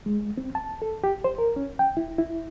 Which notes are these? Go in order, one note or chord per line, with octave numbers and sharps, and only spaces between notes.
G#3
C4
A5
A4
G4
C5
A#4
C#4
G5
E4
E4